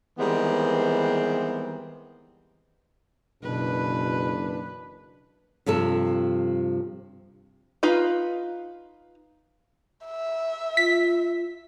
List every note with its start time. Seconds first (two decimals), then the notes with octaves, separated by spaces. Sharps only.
0.19 D#3 E3 G3 G#3 B3 C4
3.43 F#1 B2 E3 D4 B4
5.66 G2 C3 F3 A4
7.83 D#4 F4 B4 F5
10.06 E5
10.77 F4 B6